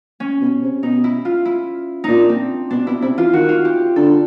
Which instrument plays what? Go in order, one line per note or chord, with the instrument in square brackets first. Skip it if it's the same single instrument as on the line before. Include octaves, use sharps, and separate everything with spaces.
[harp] C#4
[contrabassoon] B2
C3
[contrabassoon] B2 [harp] D#4
[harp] E4
F4
E4
[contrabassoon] A#2 [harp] D4 D#4
[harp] C4
[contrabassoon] B2 [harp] D4
[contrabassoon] B2 [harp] E4
[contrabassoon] C3 [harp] E4
[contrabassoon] E3 [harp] F4
[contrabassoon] D#3 [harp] F#4
[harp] F4
G4
[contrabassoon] D3 [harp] A4